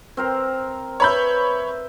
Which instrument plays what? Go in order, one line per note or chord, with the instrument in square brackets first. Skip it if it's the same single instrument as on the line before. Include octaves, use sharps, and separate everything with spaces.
[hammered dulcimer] C4 A#4 C5
[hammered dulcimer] B4 E5 [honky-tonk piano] C#5 B5 G6